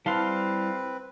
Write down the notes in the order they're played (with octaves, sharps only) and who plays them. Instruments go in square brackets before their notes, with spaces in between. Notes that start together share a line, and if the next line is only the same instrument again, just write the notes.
[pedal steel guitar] G3 C6 F6 [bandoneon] C4 B4 [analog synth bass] E4 [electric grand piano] F5 A5